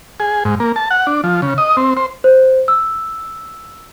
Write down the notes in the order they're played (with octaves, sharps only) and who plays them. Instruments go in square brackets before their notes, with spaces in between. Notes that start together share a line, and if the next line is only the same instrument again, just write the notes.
[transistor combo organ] G#4
G#2
A#3
A5
F#5
D4
F3
C#3
D#5
C4
C5
[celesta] C5
E6